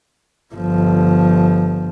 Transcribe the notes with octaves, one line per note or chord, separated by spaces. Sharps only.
G1 F3